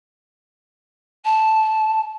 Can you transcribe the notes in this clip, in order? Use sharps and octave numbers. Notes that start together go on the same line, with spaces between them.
A5